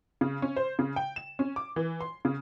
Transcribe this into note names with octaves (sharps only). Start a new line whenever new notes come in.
C#3
C#4
C5
C#3
G5
E7
C#4
D6
E3
C6
C#3